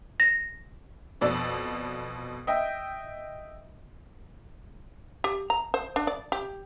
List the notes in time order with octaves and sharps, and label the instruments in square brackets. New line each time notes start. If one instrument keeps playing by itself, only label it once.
[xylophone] A#6
[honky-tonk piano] F2 B2 D5 E6
D#5 E5 G5
[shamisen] G4
A#5
C5
D4
D5
G4